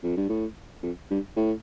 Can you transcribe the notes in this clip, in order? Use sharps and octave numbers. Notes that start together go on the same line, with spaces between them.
F2
G2
A2
F2
G2
A2